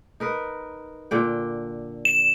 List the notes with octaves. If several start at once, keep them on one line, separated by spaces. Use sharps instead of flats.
D#4 A#4 B4
A#2 D3 G5
E7